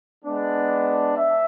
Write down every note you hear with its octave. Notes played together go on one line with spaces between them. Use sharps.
G#3 B3 D4
E5